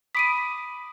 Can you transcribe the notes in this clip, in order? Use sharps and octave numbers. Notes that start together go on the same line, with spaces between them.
B5 D6 D#6 B6 D7 D#7